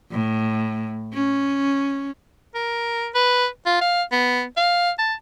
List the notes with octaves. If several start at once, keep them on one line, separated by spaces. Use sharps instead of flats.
A2
C#4
A#4
B4
F4
F5
B3
F5
A5